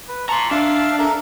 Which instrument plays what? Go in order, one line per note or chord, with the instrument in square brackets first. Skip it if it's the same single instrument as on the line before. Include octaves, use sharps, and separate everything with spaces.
[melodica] B4
[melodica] A5 C#6 [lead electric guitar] A#5 C6
[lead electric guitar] D4 [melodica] E5 F5 A5
[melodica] A4 A#4 E5